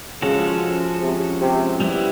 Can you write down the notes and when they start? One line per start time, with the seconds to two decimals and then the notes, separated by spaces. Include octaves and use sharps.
0.22 C#3 F3 G#3 C#4 F#4 A4
1.01 C3
1.41 C3
1.80 G3 B3 E4